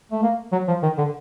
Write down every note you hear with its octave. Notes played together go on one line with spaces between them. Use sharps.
A3
A#3
F#3
F3
D#3
D3